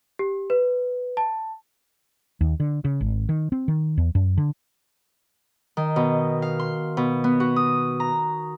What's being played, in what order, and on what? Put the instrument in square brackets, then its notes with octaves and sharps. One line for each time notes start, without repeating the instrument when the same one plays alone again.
[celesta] G4
B4
A5
[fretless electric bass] D#2
D3
C#3
G#1
D#3
C4
D#3
E2
F#2
D3
[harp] D#3
B2
F5
C6
B2
B3
F#4
D#6
A#5